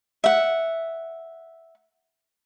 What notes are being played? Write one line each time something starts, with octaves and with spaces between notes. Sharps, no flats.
E5 F#5